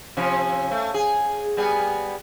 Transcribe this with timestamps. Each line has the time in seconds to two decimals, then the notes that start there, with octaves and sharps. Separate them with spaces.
0.17 C3 F3 C#4
0.71 A3
0.94 G#4
1.57 G3 B3 G#4